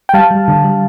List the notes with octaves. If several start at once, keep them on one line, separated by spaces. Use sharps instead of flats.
G5
G3 F5 A5
G3
D3
G3